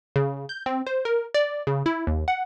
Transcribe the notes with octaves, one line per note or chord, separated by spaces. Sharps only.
C#3
G6
C4
C5
A#4
D5
C#3
E4
D#2
F#5